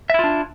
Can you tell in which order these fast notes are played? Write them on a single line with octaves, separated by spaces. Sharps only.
E5 E4 F4 D4